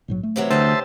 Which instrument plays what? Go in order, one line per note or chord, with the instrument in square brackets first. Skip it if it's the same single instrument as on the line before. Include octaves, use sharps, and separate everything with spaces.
[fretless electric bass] A#1 G#2 F#3
A3
[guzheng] C3 E3 F#3
[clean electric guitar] D2 [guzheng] C4 D#5 [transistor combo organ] C5 E5 A5